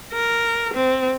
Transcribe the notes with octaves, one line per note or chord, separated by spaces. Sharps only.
A#4
C4